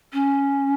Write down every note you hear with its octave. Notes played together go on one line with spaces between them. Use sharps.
C#4